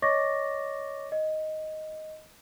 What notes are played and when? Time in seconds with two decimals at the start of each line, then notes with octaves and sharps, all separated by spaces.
0.02 C#5 D#5 C#6 D6 A6 A#6
1.12 D#5